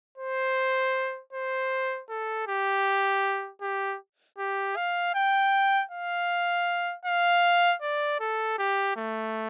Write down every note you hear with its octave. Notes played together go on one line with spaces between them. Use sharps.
C5
C5
A4
G4
G4
G4
F5
G5
F5
F5
D5
A4
G4
A3